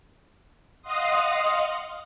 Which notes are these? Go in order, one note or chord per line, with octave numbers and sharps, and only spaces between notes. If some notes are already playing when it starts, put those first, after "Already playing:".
D#5 F5 F#5 C6 D#6